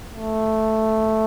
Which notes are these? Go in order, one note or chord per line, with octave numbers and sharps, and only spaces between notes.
A3